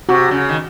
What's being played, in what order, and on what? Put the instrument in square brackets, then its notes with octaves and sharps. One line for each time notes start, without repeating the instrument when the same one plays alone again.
[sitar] C3 [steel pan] F#4
[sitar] C#3
D#3